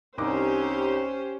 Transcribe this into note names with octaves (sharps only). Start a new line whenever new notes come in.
C2 C#4 D#4 G4 C5 D6